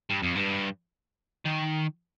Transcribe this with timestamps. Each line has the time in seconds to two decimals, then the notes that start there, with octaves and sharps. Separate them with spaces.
0.10 G2
0.23 F2
0.36 G2
1.45 D#3